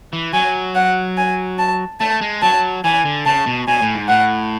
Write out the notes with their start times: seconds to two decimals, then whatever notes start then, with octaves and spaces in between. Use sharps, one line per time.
0.13 E3
0.34 F#3 G#5
0.75 F#5
1.18 G#5
1.59 A5
2.00 A3 A5
2.21 G#3
2.42 F#3 A5
2.84 E3 G#5
3.05 D3
3.26 C#3 A5
3.46 B2
3.68 B2 G#5
3.82 A2
3.95 G#2
4.09 A2 F#5